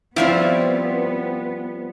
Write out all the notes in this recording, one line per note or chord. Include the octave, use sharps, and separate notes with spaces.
F3 G3 B3 C4 E4 C#5 F5